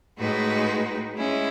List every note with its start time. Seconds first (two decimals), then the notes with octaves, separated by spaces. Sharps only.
0.17 A2 G#3 D#4 F#4 B4
1.16 G#3 C#4 E4